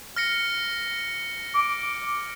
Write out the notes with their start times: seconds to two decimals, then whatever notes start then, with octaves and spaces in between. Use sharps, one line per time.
0.16 F6 A#6 C#7
1.54 D6